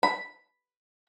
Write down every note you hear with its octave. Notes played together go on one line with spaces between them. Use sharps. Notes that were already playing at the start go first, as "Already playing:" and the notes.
B5